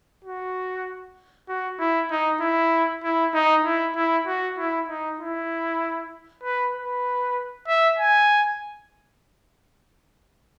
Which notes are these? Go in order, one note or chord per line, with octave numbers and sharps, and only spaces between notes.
F#4
F#4
E4
D#4
E4
E4
D#4
E4
E4
F#4
E4
D#4
E4
B4
B4
E5
G#5